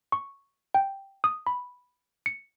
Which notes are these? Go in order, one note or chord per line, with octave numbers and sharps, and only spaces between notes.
C#6
G5
D#6
B5
C#7